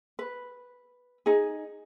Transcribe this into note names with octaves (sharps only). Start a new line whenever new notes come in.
B4
D#4 G#4